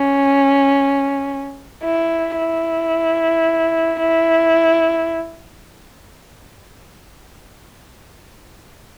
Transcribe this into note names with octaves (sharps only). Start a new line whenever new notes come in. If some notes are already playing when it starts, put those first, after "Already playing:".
Already playing: C#4
E4
E4
E4